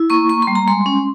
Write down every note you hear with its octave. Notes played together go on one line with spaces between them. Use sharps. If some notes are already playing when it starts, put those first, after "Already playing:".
Already playing: E4
A#3 C#6
A#3 C#6
C6
G3
A#5
G#3 C6
C#4